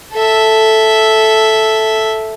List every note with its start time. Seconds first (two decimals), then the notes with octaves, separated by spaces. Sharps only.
0.13 A4 E5